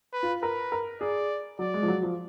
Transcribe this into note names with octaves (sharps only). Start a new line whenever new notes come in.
B4
F4
A#4 B4
A#4
G#4 D5
F#3 D5
G#3
F3
F#3
F3